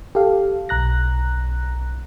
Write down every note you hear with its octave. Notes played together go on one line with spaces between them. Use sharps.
G4 A4 F5
B1 A#5 F#6 A#6